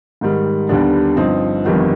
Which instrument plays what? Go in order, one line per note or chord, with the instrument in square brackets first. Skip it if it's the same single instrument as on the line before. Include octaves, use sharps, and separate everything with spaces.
[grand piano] G#2 D#3 G3
D#2 D3 G3 B3 D4
G1 G2 F3 C4 D#4
G1 F2 D#3 G3 B3